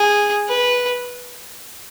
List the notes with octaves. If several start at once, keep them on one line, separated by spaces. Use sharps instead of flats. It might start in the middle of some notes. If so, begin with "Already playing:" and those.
Already playing: G#4
B4